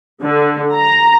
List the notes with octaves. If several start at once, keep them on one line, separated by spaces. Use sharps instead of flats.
D3
A#5